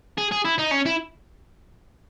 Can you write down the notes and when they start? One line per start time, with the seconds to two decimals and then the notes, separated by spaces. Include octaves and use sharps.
0.18 G#4
0.31 G#4
0.45 E4
0.58 D#4
0.71 C#4
0.86 E4